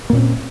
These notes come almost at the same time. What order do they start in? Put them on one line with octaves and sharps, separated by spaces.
A#3 A#2 C#4 C4